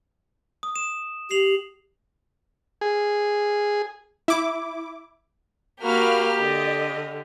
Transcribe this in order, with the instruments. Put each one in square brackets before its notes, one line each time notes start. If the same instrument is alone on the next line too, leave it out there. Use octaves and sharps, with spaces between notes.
[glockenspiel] D#6
E7
[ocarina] G4 [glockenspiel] C7 F7 F#7
[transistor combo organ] G#4
[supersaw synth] E4 D6
[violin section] A#3 B5 F6 [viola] F#4 F5 [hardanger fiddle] G4
[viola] D3 [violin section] D#5